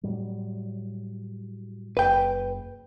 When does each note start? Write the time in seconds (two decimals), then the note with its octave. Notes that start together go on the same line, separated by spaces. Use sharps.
0.03 A2 F#3 G3
1.97 F#1 B4 G5